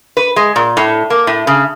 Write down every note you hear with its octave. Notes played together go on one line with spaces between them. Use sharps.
B4
G#3
A#2
A2
A#3
A2
C#3